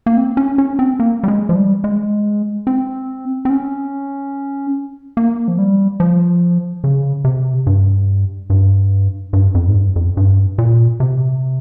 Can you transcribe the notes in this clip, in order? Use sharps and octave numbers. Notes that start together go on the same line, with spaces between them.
A#3
C4
C#4
C#4
C4
A#3
G3
G#3
F3
G3
G#3
C4
C4
C#4
A#3
F3
G3
F3
C#3
C3
G2
G2
G2
F2
G#2
G2
F2
G2
A#2
C3